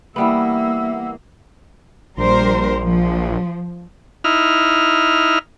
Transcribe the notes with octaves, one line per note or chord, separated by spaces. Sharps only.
E3 G3 A#3 B3 E5 F#5 E6
A#1 G3 A#4 C5
F3
D#4 E4 F6